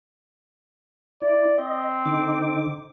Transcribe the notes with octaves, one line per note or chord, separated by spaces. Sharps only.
E4 D5
C4 D#5
D3 D#4 D6